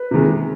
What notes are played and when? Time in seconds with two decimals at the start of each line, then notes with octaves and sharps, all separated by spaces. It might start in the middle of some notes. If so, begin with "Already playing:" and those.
Already playing: B4
0.11 C3 D#3 G#3